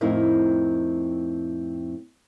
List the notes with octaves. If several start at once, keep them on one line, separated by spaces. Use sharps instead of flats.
F2 A2 C4 D#4 E4 A#4